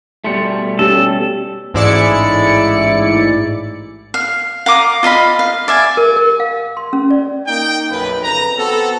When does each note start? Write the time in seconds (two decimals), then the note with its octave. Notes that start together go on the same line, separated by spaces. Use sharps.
0.24 B2 G3 A3 C6 C#7
0.79 C#4 G4 A4
1.74 A1 G#2 E4 D5 C#7
4.14 F5
4.66 F5 A#5 D6 D#6
5.03 F4 D#5 F5 B5
5.39 F5
5.68 D5 E5 G#5
5.97 A#4
6.16 A#4
6.40 F5
6.77 C6
6.93 C#4
7.11 D5
7.47 A#3 D#4 G5
7.91 B1 F#2 B4
8.23 F2 C#3 B4 A#5
8.58 B3 C4 F#4 A4